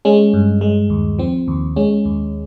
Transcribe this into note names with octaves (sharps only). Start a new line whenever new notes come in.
G#3 C#4
G2
G#3
D#2
F3 C4
D#2
G#3 C#4
D#2